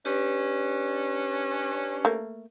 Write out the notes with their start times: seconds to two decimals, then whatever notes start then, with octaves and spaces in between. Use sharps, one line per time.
0.05 C#4 D4 G4 B4
2.05 A3 A#3